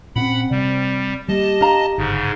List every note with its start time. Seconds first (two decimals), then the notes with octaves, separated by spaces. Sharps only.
0.16 A#2 C4 C#4 F#5 B5
0.51 C3 G3
1.29 G3 A#3 G4 D#5 A5
1.61 D4 F5 A#5
1.98 G1 G#2 C#3